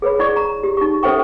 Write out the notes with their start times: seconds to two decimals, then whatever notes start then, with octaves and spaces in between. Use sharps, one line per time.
0.02 G#4 B4 C#5 B5
0.19 E4 G#4 D5 C#6
0.36 A#5
0.63 G4
0.77 D#4 C#6
1.03 C#4 A4 C5 E5 G5 C#6